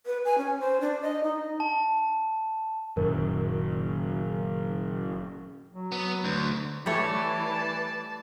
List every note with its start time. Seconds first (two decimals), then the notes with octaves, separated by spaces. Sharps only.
0.06 B4
0.25 G#5
0.38 C#4
0.60 C5
0.81 D4
1.02 D#5
1.24 D#4
1.60 A5
2.97 F#1 F#2 A#2 D#3 A#4
5.71 F#3
5.92 B3
6.25 D2
6.86 E3 G3 A3 C#5 D5 A5